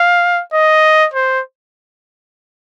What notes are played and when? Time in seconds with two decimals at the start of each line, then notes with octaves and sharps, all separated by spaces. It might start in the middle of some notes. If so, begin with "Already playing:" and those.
Already playing: F5
0.53 D#5
1.14 C5